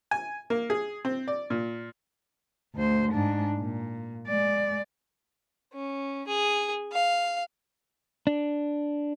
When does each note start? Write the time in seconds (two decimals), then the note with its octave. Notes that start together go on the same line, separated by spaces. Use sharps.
0.11 G#5
0.50 A#3
0.70 G#4
1.05 C4
1.28 D5
1.50 A#2
2.75 D2 C5
3.12 G#2 D4
3.57 A#2
4.27 G#3 D5
5.73 C#4
6.27 G#4
6.93 F5
8.27 D4